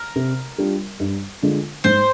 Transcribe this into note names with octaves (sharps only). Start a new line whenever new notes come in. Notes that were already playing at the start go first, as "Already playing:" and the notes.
Already playing: A#4
C3
G3 D4 F4
G2
D3 G#3 D4 F4
G#2 C5